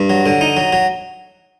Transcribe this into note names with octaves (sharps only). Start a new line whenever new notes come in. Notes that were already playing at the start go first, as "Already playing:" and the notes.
Already playing: G2
F#3
D3
D#4
F#3
F#3